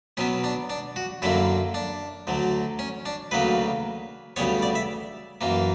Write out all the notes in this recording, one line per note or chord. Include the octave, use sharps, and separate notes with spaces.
B2 F#3 B3 C#4
D4
D4
F#4
F#2 D3 F#3 A#3 E4
D4
D2 D3 F#3
C#4
D4
D2 C#3 F#3 A#3 B4
D2 C#3 G3 B3 C#5
D5
E5
F#2 E3 A#3